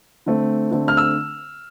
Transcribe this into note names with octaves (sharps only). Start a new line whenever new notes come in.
D3 A3 C4
D3 A3 C4
F6
E6